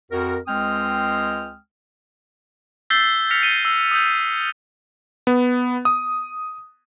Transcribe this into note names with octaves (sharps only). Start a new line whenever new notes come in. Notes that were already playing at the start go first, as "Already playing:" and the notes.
F2 F#4 A#4
C#2 G#3 C4 G5 D#6 F6
E6 G6 A6 B6 C7 G7
F6 A#6 B6 C#7 F7
C#7 D#7 G7
E6
D#6 E6 G6
B3
D#6